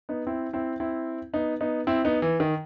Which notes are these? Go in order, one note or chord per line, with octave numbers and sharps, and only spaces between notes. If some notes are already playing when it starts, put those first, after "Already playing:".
B3 D#4
C4 E4
C4 E4
C4 E4
B3 D#4
B3 D#4
C4 E4
B3 D#4
E3
D#3